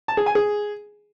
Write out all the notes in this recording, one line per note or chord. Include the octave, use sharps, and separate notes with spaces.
A5
G#4
G#5
G#4